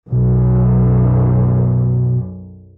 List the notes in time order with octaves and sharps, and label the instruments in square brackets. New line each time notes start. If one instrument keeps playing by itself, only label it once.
[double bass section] B1 F#2 [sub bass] B2